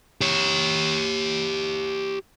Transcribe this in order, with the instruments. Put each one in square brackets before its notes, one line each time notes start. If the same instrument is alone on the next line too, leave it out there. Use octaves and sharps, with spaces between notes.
[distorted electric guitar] G4 C#5